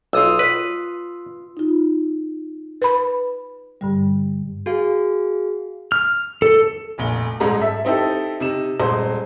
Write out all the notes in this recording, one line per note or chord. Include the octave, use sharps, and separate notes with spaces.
B1 F4 D#6 E6
B4
D#4 F4
B4 B5
G2 D3 G3
F#4 G#4 F5
F6
A4
F1 A#1 G7
D#1 G#2 G#3 A#5
A4 E5
C4 D#4 E4 G4 A4
C3 D#4 E7
D#1 G#3 C5